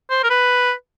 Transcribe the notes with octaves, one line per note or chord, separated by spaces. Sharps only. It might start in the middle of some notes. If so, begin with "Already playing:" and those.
C5
A#4
B4